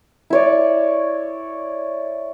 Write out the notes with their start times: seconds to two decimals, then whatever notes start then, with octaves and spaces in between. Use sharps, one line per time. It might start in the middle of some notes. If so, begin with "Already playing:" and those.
0.30 E4 C#5 D5